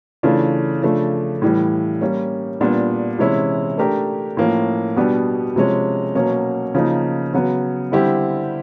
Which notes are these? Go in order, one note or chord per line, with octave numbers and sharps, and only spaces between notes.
C#3 E3 A3 D4 F4
C#3 F3 A3 D4
A2 E3 G3
G3 A#3 C#4
A#2 G3 B3 D4
C3 E3 G#3 C#4 E4
A3 D4 G4 A#4
A2 F3 A#3 C#4
B2 G3 B3 D4 G4
C3 F3 G#3 C#4
B2 F#3 A#3 C#4
C#3 F3 A#3 D#4
C#3 F#3 B3
D3 G3 C4 E4 G4